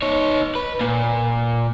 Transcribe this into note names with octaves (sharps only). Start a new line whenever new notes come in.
D#4 C#5
B4
A#2